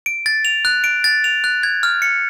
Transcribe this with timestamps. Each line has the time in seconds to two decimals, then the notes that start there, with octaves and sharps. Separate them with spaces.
0.06 D7
0.26 A6
0.45 F7
0.65 F#6
0.84 D7
1.04 A6
1.24 F7
1.44 F#6
1.63 G#6
1.83 F6
2.02 C#7